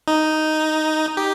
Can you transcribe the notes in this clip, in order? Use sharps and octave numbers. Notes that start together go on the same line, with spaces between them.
D#4
G4